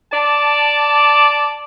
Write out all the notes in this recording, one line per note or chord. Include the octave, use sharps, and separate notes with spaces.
D5 A5